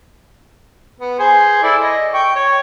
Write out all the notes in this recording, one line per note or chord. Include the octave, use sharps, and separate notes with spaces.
B3
G#4 C5 G#5
E4 A4 D5
D#5
G5 C#6
C#5